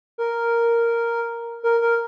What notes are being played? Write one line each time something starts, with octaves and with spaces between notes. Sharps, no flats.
A#4
A#4
A#4